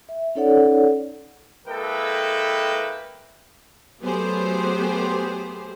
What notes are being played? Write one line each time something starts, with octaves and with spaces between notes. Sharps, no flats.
E5
C#4 D#4 A4 C#5 D5 F#5
G#3 A#3 E4 A4 B4 G5
F#3 A3 B3 G4 G#4 C5